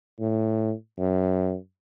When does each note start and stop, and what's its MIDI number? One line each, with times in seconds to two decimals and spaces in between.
0.20 0.73 45
0.98 1.55 42